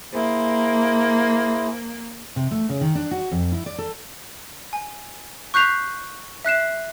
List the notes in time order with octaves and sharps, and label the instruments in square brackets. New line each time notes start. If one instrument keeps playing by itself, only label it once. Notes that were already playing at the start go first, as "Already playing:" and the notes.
[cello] A#3 [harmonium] E4 G#4 C5
[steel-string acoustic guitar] C3
A3
C#3
D#3
D4
F#4
F2
E4
D5
A4
[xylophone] G#5
C#6 F#6 G6 B6 C7 F7
E5 F#6 C7 E7